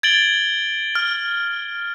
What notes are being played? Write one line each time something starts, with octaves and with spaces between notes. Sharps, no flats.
G#6 A6 D7 F#7 G7
F6